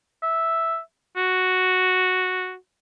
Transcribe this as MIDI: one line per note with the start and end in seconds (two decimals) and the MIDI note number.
0.23 0.79 76
1.16 2.55 66